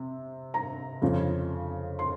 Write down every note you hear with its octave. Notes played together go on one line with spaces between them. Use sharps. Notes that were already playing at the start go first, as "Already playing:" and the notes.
Already playing: C3
A#5
F2 C#3 F3
C6